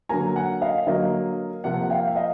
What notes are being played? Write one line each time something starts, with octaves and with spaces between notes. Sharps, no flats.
D3 F#3 A#3 G#5 A#5
F#5 G#5
D#5 F5
D3 F#3 A#3 D#5 F5
C3 F3 A#3 E5 F#5
F#5
F5 G5
E5
D#5 F5